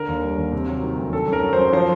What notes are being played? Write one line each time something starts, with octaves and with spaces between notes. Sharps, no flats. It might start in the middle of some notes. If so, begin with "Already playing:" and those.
Already playing: D3 A#4
D#2
G3
D#2
C3
F#3
D#3
D2
D#3 A4
F#2 A#4
F#3
F#2 C5
F3 C5